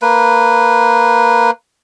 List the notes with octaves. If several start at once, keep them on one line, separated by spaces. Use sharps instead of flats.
A#3 B4